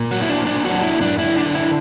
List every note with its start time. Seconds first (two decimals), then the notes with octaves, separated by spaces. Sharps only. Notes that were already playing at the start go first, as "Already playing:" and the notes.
Already playing: A#2 A#3
0.11 F#3 F#4
0.22 E4
0.29 A#3 D4
0.46 D4
0.65 F#3 D4 F#4
0.83 E4
1.01 F#2 D4
1.18 E4
1.37 D3 D4
1.55 E4